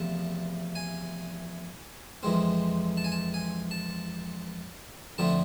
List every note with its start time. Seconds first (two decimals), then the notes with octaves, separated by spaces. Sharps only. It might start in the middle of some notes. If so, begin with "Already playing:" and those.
Already playing: E2 C3 F3 A3 A5
0.75 G#5
2.23 F2 E3 G#3 C4
2.97 A5
3.04 G#5
3.12 A5
3.34 G#5
3.71 A5
5.18 F2 D3 A3 C4 A5